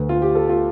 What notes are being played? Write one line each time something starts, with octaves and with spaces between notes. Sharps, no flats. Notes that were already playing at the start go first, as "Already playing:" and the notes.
Already playing: D2 D3 B4
F4
G4
A4
F4